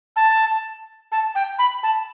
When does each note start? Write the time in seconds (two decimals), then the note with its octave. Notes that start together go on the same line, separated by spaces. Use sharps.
0.16 A5
1.12 A5
1.35 G5
1.59 B5
1.83 A5